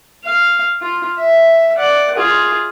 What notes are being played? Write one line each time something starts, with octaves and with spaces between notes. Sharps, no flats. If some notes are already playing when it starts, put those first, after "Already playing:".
F5
F4
E5
D5 F#5
F4 G#4